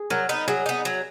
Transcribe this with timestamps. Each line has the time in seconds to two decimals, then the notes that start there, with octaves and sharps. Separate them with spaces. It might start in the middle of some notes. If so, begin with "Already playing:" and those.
Already playing: G#4
0.10 F#3 A#4
0.29 B3 D#4
0.48 F#3 G#4
0.66 B3 D#4
0.85 F#3